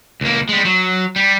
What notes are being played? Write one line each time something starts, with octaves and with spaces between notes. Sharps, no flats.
C#2 A#3
G3 G#3
F#3
G3